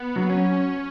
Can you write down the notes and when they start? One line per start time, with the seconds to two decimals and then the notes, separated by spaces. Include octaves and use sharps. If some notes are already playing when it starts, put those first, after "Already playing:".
Already playing: B3
0.16 F#3
0.30 C#4